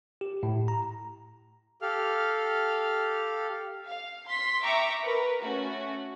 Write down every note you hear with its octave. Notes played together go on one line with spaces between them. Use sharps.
G4
A2
A#5
G4 A4 F5 F6
F5
C6 B6
E5 G5 A#5 C#6 D6
A#4 B4
A3 C#4 F#4